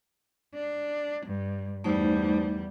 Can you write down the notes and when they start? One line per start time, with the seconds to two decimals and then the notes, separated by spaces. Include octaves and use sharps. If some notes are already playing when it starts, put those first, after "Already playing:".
0.54 D4
1.26 G2
1.84 E2 G3 A3 D#4 C5